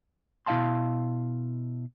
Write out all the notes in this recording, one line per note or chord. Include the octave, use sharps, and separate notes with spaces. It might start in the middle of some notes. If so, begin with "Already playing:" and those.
B2 E4 E5 F5 A5 C6